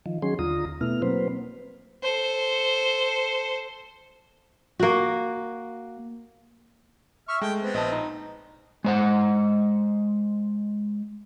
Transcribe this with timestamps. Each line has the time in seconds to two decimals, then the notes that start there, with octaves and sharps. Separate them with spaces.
0.06 D#3 F3
0.22 D#3 F#3 C#4 G#4 C6
0.39 D#2 D3 F4 A#5 D#6
0.81 B2 A3 B3 E4 F6
1.02 F#3 A#3 C4 B4 C5
2.03 A4 C5
4.79 A#3 F#4
7.28 E5 C#6 F6
7.41 G#3 A3 G5
7.60 B3 C4
7.74 A#1 D#5 A5
7.92 D#4
8.84 G#3 C5 F#5